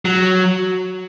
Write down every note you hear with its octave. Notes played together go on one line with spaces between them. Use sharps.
F#3